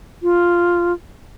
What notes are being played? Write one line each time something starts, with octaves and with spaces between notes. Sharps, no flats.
F4